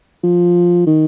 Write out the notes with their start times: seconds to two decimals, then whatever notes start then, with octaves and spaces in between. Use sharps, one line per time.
0.24 F3
0.87 D#3